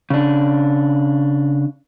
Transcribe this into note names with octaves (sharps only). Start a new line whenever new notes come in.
C#3 D4